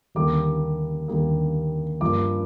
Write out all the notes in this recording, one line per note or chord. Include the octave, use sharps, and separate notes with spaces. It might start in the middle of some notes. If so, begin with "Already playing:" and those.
D#2 D3 G3 A#3 D6
D#2 D3 G3 A#3
G2 F3 A#3 D6